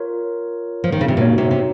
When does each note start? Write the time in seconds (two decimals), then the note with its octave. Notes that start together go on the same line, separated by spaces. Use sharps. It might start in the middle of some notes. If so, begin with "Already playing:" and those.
Already playing: F4 A#4 C#5
0.84 F3
0.92 D#3
1.01 C#3
1.08 C3
1.17 A#2 D#4 F#4 C#5
1.38 C3
1.51 C3